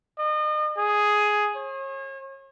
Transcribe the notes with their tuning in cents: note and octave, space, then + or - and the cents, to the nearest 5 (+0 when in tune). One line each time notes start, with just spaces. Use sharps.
D#5 -35
G#4 +5
C#5 -40